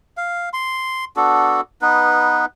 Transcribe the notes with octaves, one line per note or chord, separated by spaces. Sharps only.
F5
C6
B3 D4 F#4 A4
B3 D#4 B4